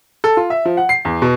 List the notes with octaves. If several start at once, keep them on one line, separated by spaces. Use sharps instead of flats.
A4
F4
E5
F3
F#5
C7
E2
B2